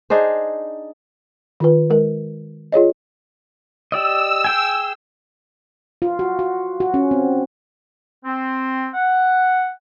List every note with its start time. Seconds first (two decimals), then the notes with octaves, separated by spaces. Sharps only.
0.10 D4 D#4 G#4 C5
1.60 D#3 F4 B4
1.90 G#3 A#4
2.72 F4 G#4 C#5 D#5
3.92 G4 D5 D#5 E6
4.44 G#4 G5 G#5
6.02 F4
6.19 F#4
6.39 F#4
6.80 F#4
6.94 C#4
7.11 C4
8.25 C4
8.94 F#5